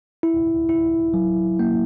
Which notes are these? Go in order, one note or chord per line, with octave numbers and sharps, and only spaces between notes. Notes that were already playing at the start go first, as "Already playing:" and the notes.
E4
E4
F#3
A#3